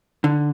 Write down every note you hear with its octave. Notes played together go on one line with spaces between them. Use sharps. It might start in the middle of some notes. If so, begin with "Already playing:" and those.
D3